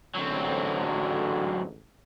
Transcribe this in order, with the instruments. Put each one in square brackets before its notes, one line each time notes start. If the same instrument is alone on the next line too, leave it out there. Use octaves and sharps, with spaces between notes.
[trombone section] A1 G#2 D3 [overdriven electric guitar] F#3 C4